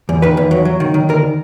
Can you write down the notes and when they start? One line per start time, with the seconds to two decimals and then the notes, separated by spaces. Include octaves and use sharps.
0.09 E2
0.22 D#3 B4
0.37 E2
0.51 F#3
0.65 F#3
0.80 D#3
0.94 D#3
1.09 D2 A#4